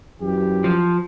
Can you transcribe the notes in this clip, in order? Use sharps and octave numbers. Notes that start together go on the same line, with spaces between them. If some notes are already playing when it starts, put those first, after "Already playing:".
F#2 E3 G4
F3